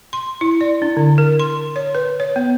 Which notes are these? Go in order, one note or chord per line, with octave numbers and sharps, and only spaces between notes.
C6
E4
D5
D4
D3
A#4
C6
C#5
B4
C#5
B3